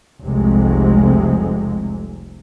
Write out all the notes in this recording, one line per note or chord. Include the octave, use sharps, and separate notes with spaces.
F1 C2 C3 G#3